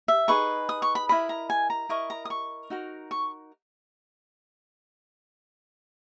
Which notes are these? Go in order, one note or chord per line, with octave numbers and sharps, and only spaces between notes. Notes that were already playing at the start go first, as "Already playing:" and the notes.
E5
D#4 G#4 B4 D#5 C#6
D#6
C#6
B5
E4 A#4 D#5 B5
A#5
G#5
A#5
E4 A#4 D#5 C#6
A#5
D#6
C#6
D#4 F#4 A#4
C#6